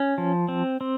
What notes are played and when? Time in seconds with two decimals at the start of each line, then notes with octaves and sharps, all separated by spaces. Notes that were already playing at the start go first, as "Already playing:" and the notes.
Already playing: C#4
0.18 F3
0.48 C4
0.81 C4